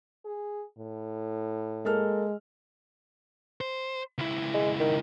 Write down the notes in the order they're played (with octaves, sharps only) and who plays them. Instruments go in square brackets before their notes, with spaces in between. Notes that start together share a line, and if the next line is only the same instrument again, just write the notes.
[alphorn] G#4
A2
[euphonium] G#3 [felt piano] A#3 A4 F6
[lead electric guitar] C5
C#2 E4
[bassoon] G#3
D#3